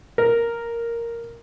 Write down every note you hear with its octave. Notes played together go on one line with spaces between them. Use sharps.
A#4